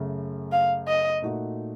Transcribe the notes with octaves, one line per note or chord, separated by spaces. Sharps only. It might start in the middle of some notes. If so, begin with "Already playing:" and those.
Already playing: F#2 C#3 A3
F5
D#5
A#2 A3 D#4 F#4